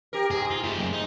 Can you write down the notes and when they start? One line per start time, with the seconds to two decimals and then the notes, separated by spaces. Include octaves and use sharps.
0.13 G4 A#4
0.31 G#2 G#4
0.51 F4
0.64 A3 G4
0.77 F#2 A#3
0.93 D#4